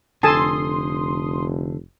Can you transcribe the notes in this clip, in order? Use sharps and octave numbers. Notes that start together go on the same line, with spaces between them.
F1 D3 A4 G#5 A5 C6 D#6